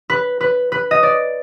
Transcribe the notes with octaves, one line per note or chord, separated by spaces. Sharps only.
B4
B4
B4
D#5
D5